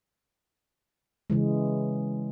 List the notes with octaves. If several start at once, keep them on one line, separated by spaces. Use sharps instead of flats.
C#3 E3 G#3